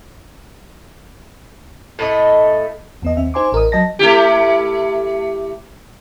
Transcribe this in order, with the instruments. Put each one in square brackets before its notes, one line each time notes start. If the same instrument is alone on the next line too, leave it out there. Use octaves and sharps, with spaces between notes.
[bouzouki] A2 A3 D#5
[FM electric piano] E2 B3 D#5
D#2 C4 E5
D#4 C5 G#5 C6 D6
A1 A#4 D#5 D#6
F#3 D#5 A5 A#6
[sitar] A3 E4 G4